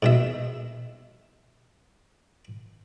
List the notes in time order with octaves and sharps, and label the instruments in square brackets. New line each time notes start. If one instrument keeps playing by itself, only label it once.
[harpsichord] G#2 B2 E5